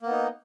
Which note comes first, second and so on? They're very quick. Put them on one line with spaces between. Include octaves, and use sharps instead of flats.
A#3 B3 D#4